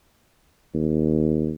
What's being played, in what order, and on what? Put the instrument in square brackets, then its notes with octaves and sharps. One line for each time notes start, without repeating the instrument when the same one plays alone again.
[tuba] D#2